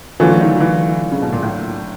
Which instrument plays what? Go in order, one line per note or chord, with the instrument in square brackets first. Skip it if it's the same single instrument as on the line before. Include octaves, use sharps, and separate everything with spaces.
[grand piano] D3 F#3 A3 C#4 F4 [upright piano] E3
[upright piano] D#3
E3
C#3
B2
A#2
A2